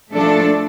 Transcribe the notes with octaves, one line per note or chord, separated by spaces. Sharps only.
F3 A3 D4 A4